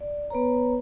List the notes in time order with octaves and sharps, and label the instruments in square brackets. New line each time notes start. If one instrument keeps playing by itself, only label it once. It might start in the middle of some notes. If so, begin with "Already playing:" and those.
[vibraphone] D5
B3 B4 C#5 A#5